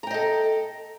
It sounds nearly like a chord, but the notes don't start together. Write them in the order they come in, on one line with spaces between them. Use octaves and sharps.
A#5 G5 D#5 A4